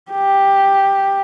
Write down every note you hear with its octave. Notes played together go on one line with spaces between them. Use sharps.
G4